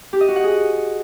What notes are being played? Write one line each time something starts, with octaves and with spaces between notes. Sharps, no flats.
G4
D#5
F#4
F#5
G#4